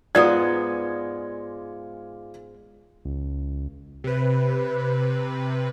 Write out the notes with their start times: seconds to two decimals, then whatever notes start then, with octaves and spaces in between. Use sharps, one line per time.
0.15 G#2 G#3 B3 F4 D5 G#6
3.05 C#2
4.04 C3 B4